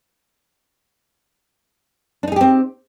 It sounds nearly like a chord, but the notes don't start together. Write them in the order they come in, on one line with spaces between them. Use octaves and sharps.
D4 D#4 G#4 G4 C4